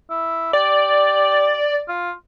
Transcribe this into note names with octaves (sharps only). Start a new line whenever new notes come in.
E4
G4 D5
F4